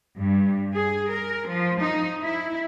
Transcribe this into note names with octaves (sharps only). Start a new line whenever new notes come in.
G2
G#4
A#4
F3
D#4
E4